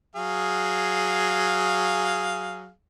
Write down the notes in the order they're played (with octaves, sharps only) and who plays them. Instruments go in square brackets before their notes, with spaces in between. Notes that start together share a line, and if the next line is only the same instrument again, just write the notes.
[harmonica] F#3 G#4 F5